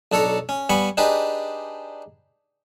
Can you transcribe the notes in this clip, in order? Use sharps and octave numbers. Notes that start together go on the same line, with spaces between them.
B1 D4 A4 C#5 A#5
C#4
G3 B3 G#5 B5 C#6
D4 D#4 G4 G#4 B4